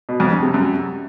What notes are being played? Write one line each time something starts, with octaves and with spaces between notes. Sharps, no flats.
B2
F2
G2
C3
F#2